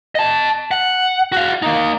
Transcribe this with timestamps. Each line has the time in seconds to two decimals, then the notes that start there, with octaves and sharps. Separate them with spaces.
0.15 D#5 A5
0.71 F#5
1.32 F#4 F5
1.62 A#3 D#4